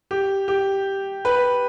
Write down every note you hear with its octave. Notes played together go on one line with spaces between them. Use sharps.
G4
G4
B4